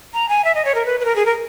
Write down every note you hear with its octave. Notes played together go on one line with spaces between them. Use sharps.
A#5
G#5
E5
D#5
C#5
A#4
B4
B4
A#4
G#4
A#4